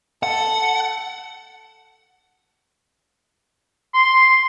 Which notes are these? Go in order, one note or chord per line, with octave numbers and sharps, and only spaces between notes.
A4 F#5
C6